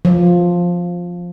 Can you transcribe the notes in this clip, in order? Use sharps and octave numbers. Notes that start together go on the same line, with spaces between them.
F3